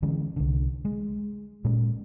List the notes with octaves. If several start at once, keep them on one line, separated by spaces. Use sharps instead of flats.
D3 E3 G#3 C#4
C2 D3
G#3
A#2 G#3 C#4